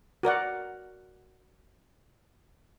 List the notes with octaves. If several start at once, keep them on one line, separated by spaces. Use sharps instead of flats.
F#4 A#4 D5 F#5